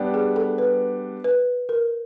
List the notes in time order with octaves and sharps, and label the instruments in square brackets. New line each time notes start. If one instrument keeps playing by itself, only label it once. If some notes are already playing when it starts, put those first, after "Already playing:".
Already playing: [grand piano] G3 B3 D4 G4
[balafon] G#4
A4
B4
B4
A#4